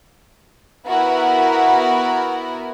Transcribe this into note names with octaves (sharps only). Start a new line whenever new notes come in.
B3 E4 F#4 A#4